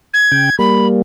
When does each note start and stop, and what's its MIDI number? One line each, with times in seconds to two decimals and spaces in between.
0.14 0.56 92
0.32 0.50 49
0.32 0.50 79
0.59 1.02 55
0.59 1.02 58
0.59 0.87 83